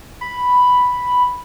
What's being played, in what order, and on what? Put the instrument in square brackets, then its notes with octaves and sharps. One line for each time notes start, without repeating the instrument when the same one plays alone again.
[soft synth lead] B5